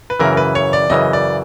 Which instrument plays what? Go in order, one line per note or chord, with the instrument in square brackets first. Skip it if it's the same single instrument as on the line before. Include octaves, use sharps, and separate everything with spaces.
[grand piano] B4
[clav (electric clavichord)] F#2 C#3 E3 [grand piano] A#4
[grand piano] B4
C#5
D5
[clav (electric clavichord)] F#2 C#3 E3 [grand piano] D#5
[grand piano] D5